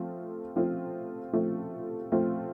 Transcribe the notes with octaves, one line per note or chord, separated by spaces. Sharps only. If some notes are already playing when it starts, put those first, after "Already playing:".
Already playing: F3 A3 C4 F4
F3 A3 C4 F4
F3 A3 C4 F4
F3 A3 C4 F4